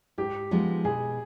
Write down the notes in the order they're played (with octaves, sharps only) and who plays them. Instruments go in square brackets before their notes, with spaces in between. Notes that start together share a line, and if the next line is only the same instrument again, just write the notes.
[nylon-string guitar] G#2 [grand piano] G4
[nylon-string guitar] F3 G#3 B3 D#4
[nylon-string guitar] B2 [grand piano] G#4